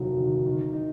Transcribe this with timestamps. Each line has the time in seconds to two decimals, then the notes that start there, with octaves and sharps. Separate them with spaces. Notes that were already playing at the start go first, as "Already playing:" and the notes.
Already playing: F1 D#2 D#3 F#3
0.18 D#3
0.46 D#3
0.73 D#4